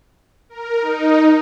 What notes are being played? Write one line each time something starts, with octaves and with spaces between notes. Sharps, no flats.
A#4
D#4